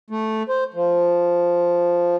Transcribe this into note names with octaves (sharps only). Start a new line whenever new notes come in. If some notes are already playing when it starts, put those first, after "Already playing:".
A3
C5
F3